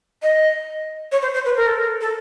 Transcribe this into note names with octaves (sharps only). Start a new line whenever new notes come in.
D#5
C#5
C5
C5
B4
A#4
A4
A#4
A4